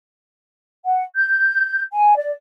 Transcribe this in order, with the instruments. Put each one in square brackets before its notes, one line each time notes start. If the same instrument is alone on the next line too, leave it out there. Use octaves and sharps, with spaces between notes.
[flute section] F#5
G6
G#5
D5